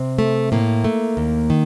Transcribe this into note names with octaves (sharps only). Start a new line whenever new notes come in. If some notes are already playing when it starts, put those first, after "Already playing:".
Already playing: C3 C4
A3
A2 A#3
A3
D#2
D#3